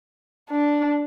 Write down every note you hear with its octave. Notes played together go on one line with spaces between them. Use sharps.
D4